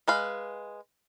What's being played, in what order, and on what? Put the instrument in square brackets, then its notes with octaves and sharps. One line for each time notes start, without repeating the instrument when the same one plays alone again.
[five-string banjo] G#3 B4 F5